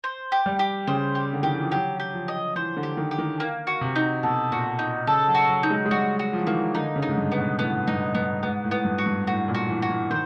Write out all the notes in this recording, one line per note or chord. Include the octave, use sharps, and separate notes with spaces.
C5
G4
G3
G4
C#3 C5
G4
D3
D#3 G4
E3
F3
F#3 G4
G4
F3
D#5
E3 C5
D3
G4
D#3
G4
D#3
A#3
F#4
C3
D#4
B2 A4
A#2 F#4
D#4
C#3 A4
F#3
F#4
F#3
D#4
G#3
G#3
G3 F#4
F#4
F3
E3
D#3 A#3
E3
D3 D#4
C#3
D#4
G#2
G2
B3
B2
A2 B3
G2 D#4
G2 B3
G#2 B3
A2
B3
G2
F#4
G2
A2 F#4
A#2
F#4
E3
F#4
E3
D#3 C5